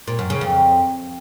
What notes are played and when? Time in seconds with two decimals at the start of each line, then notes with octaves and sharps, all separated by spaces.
0.07 A#2
0.19 F#2
0.30 C#3
0.41 F2